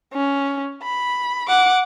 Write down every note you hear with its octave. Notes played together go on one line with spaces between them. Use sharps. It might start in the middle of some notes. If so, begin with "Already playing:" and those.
C#4
B5
F#5 D6